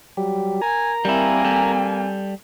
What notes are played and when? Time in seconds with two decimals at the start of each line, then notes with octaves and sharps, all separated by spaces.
0.17 F#3 G3 G4
0.62 A#4 G#5 A#5
1.05 G3 A#3 C4 E4 G#5
1.45 G3 A4